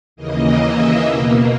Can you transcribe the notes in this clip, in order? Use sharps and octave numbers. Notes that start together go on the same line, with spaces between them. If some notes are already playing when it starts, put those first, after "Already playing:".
D#2 C#3 E3 A#3 D#5
E5
B2 A#3